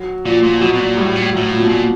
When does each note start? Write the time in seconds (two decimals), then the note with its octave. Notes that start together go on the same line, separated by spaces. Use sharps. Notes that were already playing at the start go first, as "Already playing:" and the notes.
Already playing: F#3
0.25 A#2 F3
0.43 A#2
0.53 F3
0.61 B2 F#3
0.73 B2
0.79 A#2
0.97 A2 G3
1.15 A#2
1.22 A2
1.33 F#3
1.36 A2
1.51 A#2
1.60 B2
1.69 A#2